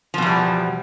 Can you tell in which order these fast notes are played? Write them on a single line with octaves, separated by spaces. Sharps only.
F3 B2 E2 G3